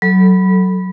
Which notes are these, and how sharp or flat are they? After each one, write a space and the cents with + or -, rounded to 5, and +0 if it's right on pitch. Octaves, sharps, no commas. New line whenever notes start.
F#3 +15 A4 +0 B5 +0